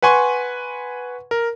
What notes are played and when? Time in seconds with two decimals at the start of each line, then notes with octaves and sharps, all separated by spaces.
0.02 B4 F#5 G#5 C6 C#6
1.31 A#4